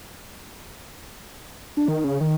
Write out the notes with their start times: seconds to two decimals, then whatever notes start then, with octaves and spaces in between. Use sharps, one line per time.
1.77 D4
1.88 D#3
2.04 C#3
2.21 D#3